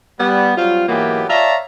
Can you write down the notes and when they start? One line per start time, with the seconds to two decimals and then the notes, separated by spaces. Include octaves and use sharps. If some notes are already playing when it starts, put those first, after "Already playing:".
0.20 G3 B3
0.57 F#3 G3 C4 F4
0.88 G#2 E3 F#3 A#3 B3 G4
1.29 C#5 D5 E5 F5 A5 A#5